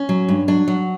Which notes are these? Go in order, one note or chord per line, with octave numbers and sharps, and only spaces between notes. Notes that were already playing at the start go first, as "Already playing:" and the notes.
Already playing: C#4
F#3
G2
F#3 D4
F#3